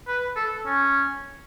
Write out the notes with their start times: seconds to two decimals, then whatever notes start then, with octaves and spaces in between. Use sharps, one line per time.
0.08 B4
0.36 A4
0.66 C#4